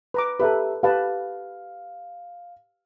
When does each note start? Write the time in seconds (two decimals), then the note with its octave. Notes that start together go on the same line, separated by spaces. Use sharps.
0.14 B4 A#5 D6
0.40 G4 A4 B4 E5 A#5
0.83 G4 B4 F5 A5